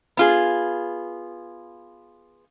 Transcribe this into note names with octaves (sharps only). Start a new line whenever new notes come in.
B3 F4 G#4